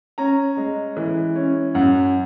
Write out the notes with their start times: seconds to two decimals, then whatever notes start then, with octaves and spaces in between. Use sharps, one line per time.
0.18 C#4 A#5
0.57 G#3
0.97 E3
1.36 C#4
1.75 F#2 F#5